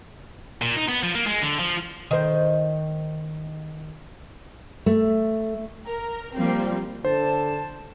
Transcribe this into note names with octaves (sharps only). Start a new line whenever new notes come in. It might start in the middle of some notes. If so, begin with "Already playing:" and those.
A#2
D#4
B3
F3
A#3
G#3
D3
F3
D#3 C5
A3
A#4
F3 G3 A#3 C4
D3 C5 A5